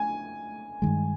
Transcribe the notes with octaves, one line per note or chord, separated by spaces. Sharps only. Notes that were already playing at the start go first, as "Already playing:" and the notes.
Already playing: G#5
G2 D#3 G#3